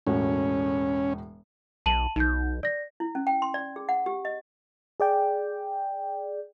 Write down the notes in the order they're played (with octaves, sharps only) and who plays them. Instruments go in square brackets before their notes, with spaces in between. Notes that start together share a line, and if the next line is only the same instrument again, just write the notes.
[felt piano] E1 A2 F#4 [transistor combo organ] C#4
[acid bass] B1 [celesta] A5 D#7 F#7
[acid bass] B1 [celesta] D#4 G6
[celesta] D5 A#6
[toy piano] E4
C#4
G5
C6
D5
G#4
F#5
G4
D#5
[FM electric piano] G#4 D5 G5